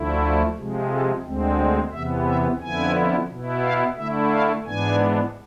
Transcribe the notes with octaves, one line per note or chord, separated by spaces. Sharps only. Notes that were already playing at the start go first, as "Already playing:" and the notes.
Already playing: D2 D3 F3 A3 E4
C3 F3 G#3
A4
D2 D3 G#3 C4
E2 C3 E3 B3 E5
E5
F2 D3 F3 B3 E4 G#5
B2 B3 E4
F5
D3 A3 E4 E5
F5
G#2 E3 B3 D4 G#5